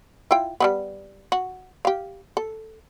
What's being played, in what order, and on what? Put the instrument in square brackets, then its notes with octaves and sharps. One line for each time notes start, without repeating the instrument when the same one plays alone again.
[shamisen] E4 F4 G5
G3 G#3 B3
F#4
G4 F5
A4